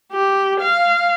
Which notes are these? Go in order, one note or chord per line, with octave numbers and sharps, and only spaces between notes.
G4
F5